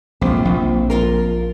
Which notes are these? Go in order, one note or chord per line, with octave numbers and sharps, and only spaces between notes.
A#1 C4 F4
A#1
F4 A#4